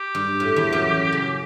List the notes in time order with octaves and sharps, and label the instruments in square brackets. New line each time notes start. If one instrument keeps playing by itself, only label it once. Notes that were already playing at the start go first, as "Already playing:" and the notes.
Already playing: [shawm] G4
[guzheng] G2
A2
E2 E3
F#2 F#3
C#3